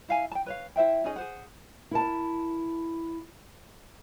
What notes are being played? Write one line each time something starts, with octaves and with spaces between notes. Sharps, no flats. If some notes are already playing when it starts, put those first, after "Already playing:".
E4 F5 G#5
G5 A5
B4 C#5 F5
E4 C5 E5 G5
C#4 D#4 G#4 D#5
G#4 C5 F#5
E4 A#4 A5